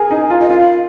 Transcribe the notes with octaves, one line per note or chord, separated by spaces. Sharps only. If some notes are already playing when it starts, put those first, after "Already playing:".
Already playing: G#4 A#4 G#5
D#4
F4
D#5
F4 F5